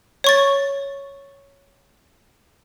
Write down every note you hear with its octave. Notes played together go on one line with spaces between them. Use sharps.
C#5 C#6 A6